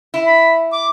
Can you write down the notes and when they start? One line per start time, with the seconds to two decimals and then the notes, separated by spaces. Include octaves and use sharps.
0.14 E4
0.26 B5
0.72 D6